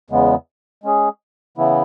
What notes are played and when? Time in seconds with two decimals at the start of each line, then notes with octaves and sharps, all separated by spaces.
0.10 E2 C#3 G#3 B3
0.84 G#3 C#4 G#4
1.57 C#3 E3 B3 E4